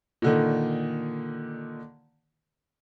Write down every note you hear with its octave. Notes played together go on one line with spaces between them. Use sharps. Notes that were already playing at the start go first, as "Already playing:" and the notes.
A#2 D3 D#3